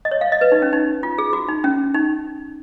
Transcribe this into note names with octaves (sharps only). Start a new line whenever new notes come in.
D#5
C#5
F5
D#5
B4
D#4
C#4
D#4
F4
G#4
F#4
D#4
C#4
D#4